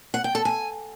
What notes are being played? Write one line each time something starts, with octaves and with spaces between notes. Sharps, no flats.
F#5
G5
A4
G#5